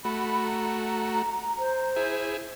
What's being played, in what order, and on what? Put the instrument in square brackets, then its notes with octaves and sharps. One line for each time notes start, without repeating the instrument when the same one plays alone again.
[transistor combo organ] A3 F#4 [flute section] B5
[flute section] A#5
[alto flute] C5
[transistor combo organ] E4 G#4